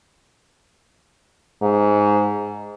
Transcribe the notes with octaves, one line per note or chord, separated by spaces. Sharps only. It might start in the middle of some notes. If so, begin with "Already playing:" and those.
G#2